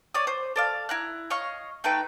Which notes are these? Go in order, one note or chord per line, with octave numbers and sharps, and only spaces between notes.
C#5 D5 D#6
C5
A4 D5 F5
E4 A#5 F#6
C#5 D#5 F5 C#6
A3 D#4 B4 G5